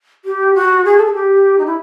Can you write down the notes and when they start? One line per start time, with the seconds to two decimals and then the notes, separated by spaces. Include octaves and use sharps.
0.25 G4
0.54 F#4
0.85 G#4
0.97 A4
1.05 G#4
1.13 G4
1.58 D#4
1.65 E4